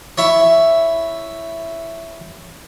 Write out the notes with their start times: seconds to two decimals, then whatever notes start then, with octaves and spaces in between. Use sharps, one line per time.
0.18 E4 C#5